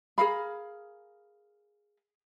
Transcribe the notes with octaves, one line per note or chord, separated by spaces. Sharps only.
G#4 A#4 F5 B5